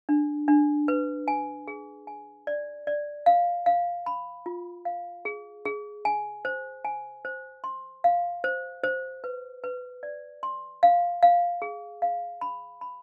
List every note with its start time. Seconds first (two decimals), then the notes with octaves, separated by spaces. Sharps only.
0.09 D4
0.48 D4
0.88 B4
1.28 G#5
1.68 G#4
2.07 G#5
2.47 D5
2.87 D5
3.26 F5
3.66 F5
4.06 B5
4.46 F4
4.85 F5
5.25 G#4
5.65 G#4
6.05 G#5
6.45 C5
6.85 G#5
7.25 C5
7.64 C6
8.04 F5
8.44 C5
8.84 C5
9.24 B4
9.64 B4
10.03 D5
10.43 C6
10.83 F5
11.23 F5
11.62 G#4
12.02 F5
12.41 B5
12.81 B5